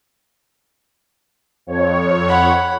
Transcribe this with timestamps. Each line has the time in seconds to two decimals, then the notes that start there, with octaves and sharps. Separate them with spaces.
1.67 F2 C#5
2.29 F#5 B5